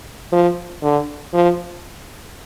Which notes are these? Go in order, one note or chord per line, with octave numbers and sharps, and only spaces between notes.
F3
D3
F3